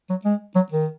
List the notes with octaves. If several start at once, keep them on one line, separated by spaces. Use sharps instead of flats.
F#3
G#3
F#3
D#3